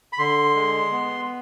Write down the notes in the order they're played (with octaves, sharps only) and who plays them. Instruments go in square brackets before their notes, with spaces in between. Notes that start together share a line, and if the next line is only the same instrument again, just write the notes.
[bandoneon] B5
D3 C6
G#3
B3